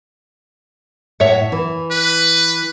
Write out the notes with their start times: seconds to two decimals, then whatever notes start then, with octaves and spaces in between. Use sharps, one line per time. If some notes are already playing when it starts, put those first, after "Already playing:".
1.20 A2 C#5 E5 F#5
1.52 E3
1.91 B4